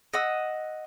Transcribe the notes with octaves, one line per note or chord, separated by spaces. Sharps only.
D#5 F#5 E6